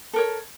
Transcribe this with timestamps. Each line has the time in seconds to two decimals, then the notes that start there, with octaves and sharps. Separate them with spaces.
0.13 A4
0.16 A#4
0.19 C#5